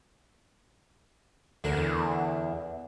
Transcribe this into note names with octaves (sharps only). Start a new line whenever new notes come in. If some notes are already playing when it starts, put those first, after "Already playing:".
D2 D3 D4 A#4
E2